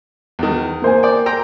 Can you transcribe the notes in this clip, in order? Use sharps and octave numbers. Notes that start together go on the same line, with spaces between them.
E2 D#3
A#3 C5 G#5
D5 G5
G5 A#5 C6